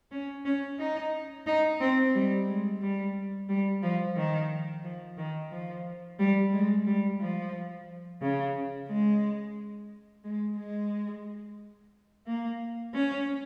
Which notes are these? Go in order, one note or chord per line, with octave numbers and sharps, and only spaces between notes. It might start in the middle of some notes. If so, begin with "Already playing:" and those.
C#4
C#4
D#4
D#4
C4
G3
G#3
G3
G3
F3
D#3
F3
D#3
F3
G3
G#3
G3
F3
C#3
G#3
G#3
G#3
A#3
C#4